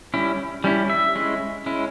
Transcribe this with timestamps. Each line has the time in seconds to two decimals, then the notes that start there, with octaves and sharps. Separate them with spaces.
0.14 G3 C#4 E4
0.64 G3 C#4 E4
0.90 E5
1.15 G#3 C#4 E4
1.66 G#3 C#4 E4